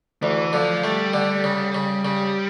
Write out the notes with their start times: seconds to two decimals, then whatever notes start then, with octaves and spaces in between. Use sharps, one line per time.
0.23 D2 E3
0.53 D3 F3
0.83 G3 A3
1.13 D3
1.44 C#3
1.75 C#3
2.04 C#3 G3